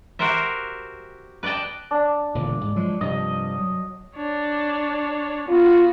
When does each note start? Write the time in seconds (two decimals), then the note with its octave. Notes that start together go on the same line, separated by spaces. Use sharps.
0.19 F#4 G4 A#4 C5 E5
1.43 B4 D5 D#5 G5 A5
1.91 D4
2.35 E1 A#2 D3
2.61 G#2
2.76 F3 F#3 G#3
3.01 G2 C3 F3 D#5
3.58 F#3
4.17 D4 C#5
5.49 B3 F4 F#4